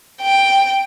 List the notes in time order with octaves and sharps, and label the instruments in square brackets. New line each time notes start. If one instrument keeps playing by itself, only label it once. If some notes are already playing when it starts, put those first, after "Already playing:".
[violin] G5